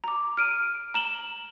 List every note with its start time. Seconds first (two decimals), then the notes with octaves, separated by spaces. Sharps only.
0.04 A#5 D6
0.37 F6 D7 D#7
0.94 A#5 E7 F#7 G7